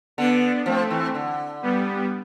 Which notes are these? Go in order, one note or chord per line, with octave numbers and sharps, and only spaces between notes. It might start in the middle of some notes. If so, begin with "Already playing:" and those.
D3 B3 D4
F3 A3 C4
E3
D3
G3 B3